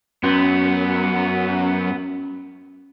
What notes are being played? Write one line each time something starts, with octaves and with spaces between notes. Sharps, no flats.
F#2 B3 C#4 F#4